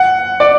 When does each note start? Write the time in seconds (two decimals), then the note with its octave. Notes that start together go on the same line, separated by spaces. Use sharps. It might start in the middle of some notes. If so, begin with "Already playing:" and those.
Already playing: F#5
0.40 D5